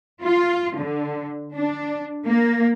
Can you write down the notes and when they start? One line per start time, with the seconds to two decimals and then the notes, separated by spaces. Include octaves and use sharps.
0.22 F4
0.77 D3
1.55 D4
2.26 A#3